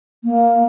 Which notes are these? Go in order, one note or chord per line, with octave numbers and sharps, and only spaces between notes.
A#3